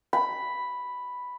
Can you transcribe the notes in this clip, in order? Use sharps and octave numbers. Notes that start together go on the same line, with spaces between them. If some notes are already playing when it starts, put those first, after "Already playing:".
B5